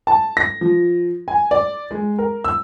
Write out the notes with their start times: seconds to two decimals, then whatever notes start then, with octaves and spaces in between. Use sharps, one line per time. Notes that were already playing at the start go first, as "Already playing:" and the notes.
0.07 A5
0.37 A#6
0.61 F3
1.28 G#5
1.51 D5
1.91 G#3
2.18 A#4
2.44 E6